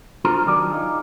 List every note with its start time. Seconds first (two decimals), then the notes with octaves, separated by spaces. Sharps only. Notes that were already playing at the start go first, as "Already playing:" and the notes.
0.25 D4 F4 F#4 A#4 C5 A#5
0.46 D#3 F#3 D4 G4 A#4 D5
0.71 D#4 F4 G#4